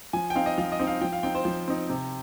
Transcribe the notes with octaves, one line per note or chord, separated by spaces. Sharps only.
F3 G#5
G5
C4 D#4 F5
D#5
F3 F5
D#5
C4 D#4
F5
F3 G5
F5
C4 D#4 G5
C5
F3
C4 D#4
C3